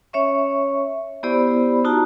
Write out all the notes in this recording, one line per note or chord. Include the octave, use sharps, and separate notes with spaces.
C#4 C#5 E5 C#6
B3 E4 G4 C5 D5 B5
D#4 F4 F#4 A5 A#5